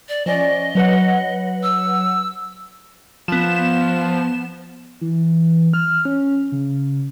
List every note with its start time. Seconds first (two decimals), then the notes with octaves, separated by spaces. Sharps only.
0.08 D5
0.26 F3 C#4 D5 D#5
0.75 F#3 B4 F#5
1.63 E6
3.28 F3 B3 E7
5.01 E3
5.73 F6
6.05 C#4
6.52 C#3